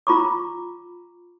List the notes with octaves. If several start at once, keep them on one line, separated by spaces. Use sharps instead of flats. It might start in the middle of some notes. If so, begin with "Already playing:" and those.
F4 A#5 B5 C#6 D6